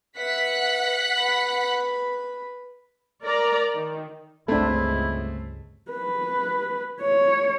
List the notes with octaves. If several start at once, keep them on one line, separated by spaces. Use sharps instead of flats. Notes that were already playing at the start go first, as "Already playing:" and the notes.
B4 E5 F#5 B6
B4 B5
A#4 D5 A#5
D#3
G1 C#2 G#3 A3 C4 D4 E4 A4
B4
C#5